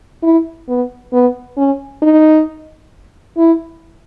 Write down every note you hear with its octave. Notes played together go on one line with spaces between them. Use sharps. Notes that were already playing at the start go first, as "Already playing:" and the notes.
E4
B3
B3
C#4
D#4
E4